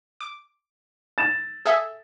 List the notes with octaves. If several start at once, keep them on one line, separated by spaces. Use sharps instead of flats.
D6
A6 E7
G#4 A4 E5